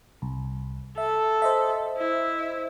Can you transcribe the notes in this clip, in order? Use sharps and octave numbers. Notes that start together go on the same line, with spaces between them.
C2
A4 E5
C5 D#5 E5
E4